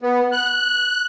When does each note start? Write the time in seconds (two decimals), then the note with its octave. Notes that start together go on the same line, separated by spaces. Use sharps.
0.01 B3
0.32 F#6